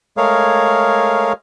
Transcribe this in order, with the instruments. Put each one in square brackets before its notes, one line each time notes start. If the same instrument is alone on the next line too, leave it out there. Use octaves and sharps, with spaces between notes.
[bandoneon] G#3 A3 G#4 A#4 C#5 F5